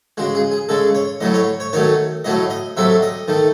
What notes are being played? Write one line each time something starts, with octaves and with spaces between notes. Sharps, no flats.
C#3 G#3 F#4
G#4
G#4
C#3 G#3 A4
C#5
A2 F#3 A3 D#5
C#5
C#5
D#3 F#3 A3 C#5
A2 F#3 A3 D#5
D#5
C3 F#3 A3 E5
D#5
D#3 A3